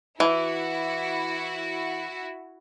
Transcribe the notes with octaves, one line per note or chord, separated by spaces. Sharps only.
E3 E4 F#4